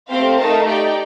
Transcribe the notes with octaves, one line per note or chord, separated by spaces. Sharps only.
A3 C4 G4 C5 F5
A3 D#4 A#4 F5 A5
D#4 G4 D5 G5